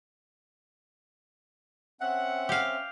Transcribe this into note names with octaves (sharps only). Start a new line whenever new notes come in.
C4 C#4 E5 F#5
G4 F5